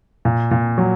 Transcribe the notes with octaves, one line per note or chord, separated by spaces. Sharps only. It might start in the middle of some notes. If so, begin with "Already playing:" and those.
A#2
A#2
F#3